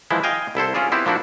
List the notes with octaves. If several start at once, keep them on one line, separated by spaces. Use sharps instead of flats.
E3 F3 G#3 E4
D#5 F5 G5 G#5
C2 E4 A4 C5
C#4 F4 G#4 D5
B3 C4 E4 G4 C5
F3 A#3 D4 E4 F#4